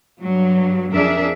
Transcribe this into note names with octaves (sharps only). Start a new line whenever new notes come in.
G2 F#3
F2 D4 G#4 A#4 E5